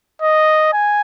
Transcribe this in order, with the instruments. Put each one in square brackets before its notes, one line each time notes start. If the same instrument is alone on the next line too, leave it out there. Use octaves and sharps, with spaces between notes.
[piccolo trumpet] D#5
G#5